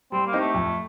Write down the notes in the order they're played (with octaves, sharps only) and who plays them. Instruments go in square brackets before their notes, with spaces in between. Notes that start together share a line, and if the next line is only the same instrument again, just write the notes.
[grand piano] G3 [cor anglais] C4
[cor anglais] A#3
[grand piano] C4 D#4 G4
[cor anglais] A3
[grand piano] F2